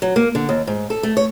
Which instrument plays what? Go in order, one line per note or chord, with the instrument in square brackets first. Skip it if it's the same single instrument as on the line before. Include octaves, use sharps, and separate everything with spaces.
[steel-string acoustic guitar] F#3
A#3
D3
D#2
G#2
A4
A3
C#5